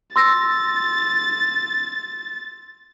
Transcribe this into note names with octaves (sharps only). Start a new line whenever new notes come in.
C6 E6 A6 A#6